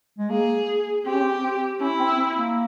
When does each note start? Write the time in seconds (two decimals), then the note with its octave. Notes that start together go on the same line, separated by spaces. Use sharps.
0.19 G#3
0.30 A#3 G#4
1.05 C4 G4
1.13 C#4
1.21 C4
1.43 C4
1.80 C#4 E4
1.99 C4
2.18 C4
2.37 A#3